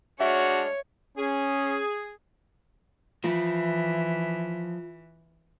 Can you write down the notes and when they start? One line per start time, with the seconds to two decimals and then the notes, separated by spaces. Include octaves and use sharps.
0.21 G#3 D4 F#4 C#5 E5 F6
1.18 C#4 G#4
3.24 E3 F3 F4